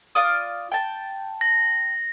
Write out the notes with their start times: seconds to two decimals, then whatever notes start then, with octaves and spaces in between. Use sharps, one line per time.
0.15 F4 D5 D#6
0.71 G5 A5
1.41 A#6